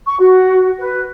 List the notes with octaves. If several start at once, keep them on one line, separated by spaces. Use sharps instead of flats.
C#6
F#4
B4